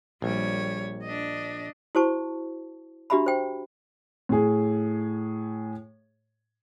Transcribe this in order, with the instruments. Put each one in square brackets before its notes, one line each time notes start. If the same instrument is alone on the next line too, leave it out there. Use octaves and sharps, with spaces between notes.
[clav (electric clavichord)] A#1 [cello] G3 C#5
[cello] D4 D#5
[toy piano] E4 F#4 C5 A5 C#6
D4 F#4 G4 E5 A#5 B5
C5 G5
[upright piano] A2 G#4